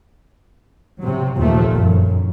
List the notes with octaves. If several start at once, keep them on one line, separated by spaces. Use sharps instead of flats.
C3 F#3
D#2 A#2 D#3 F3 A3
F1 F#2